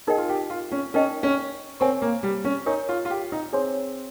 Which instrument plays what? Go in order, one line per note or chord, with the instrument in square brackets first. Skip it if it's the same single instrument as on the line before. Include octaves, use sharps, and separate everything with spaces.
[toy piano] D#4 A#4 D#5 G5 [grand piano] G#4
[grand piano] F4
G4
F4
C#4
[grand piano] C#4 [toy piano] D#4 A#4 D#5 G5
[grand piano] C#4
[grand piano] C4 [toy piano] A#4 C#5 G#5 C#6
[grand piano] A#3
G3
C#4
[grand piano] D#4 [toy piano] A#4 C#5 G#5 C#6
[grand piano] F4
F4
G4
D#4
[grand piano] C4 [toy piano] G#4 C#5 G#5 C6